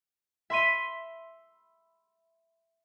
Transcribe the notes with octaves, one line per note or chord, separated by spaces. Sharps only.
E5 B5 C6 B6 D#7